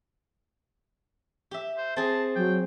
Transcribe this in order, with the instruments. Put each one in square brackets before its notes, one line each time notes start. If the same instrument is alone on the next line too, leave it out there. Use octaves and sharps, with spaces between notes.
[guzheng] G4 E5
[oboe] C5
[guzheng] C4 G#4 [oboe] A5
[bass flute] F#3 [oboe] G5